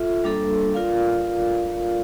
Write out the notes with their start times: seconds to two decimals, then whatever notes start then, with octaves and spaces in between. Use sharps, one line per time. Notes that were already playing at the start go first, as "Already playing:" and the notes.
Already playing: F4 A4 E5
0.24 G3 A#3 D4 A4
0.74 F4 A#4 D5 F5